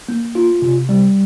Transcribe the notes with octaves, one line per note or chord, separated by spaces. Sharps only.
A#3
F4
C3
G3